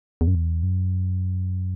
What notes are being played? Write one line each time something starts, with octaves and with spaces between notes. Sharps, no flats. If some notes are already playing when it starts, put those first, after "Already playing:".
E2
F#2
E2
F#2